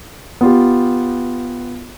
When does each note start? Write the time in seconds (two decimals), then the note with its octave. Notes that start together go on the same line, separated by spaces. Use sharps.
0.41 B3 F4 G4